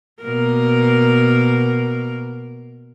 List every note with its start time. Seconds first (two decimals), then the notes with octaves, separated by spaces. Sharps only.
0.23 B2 A#3 A#4